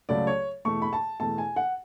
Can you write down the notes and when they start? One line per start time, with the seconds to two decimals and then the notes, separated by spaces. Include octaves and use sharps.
0.09 C#2 C#3 F#3 A3 D5
0.27 C#5
0.65 E2 B2 A3 C#6
0.82 B5
0.93 A5
1.20 E2 B2 A3 A5
1.38 G#5
1.56 F#5